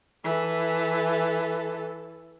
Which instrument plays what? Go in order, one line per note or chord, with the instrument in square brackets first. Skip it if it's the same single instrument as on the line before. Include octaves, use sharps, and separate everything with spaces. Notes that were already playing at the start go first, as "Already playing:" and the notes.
[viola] E3 A4